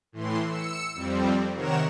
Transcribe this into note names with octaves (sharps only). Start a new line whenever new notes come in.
A2 E3 C6
E6 C#7
F2 G3 C4
C3 D#3 A#4 C#5 F#5 E7